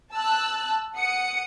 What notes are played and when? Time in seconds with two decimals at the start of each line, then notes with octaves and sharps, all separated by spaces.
0.12 A5 E6 F#6
0.96 F#5 D#6 C#7